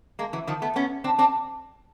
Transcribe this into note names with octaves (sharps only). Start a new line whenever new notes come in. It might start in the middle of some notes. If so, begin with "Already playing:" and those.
G#3 A#3
E3 F#3
D#3 F3
A3 B3
B3 C#4
C4 D4
C4 D4